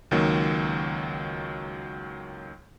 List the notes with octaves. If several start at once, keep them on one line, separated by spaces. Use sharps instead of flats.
C#2 D#3 F#3 A#3